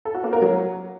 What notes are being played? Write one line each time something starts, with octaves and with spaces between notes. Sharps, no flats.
A4
F#4
A#3
A#4
F#3